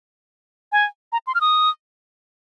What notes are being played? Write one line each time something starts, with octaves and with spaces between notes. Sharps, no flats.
G#5
A#5
C6
F6
D#6